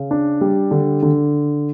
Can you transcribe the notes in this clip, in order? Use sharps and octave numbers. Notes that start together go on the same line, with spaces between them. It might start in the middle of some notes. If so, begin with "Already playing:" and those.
Already playing: C#3
D4
G3
D3
D3